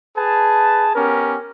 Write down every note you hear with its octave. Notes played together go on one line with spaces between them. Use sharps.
G#4 B4 A5
B3 C#4 G4 A#4